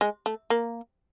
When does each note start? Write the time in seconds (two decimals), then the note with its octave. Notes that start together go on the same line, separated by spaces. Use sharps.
0.01 G#3
0.26 A3
0.50 A#3